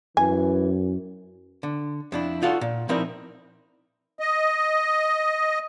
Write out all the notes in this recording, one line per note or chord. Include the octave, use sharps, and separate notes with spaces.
F#2 E3 G#5
D3
F2 D4 E4
D#4 F4 F#4 A4 D5
A#2
F3 C4 D#4 E4 A#4 D5
D#5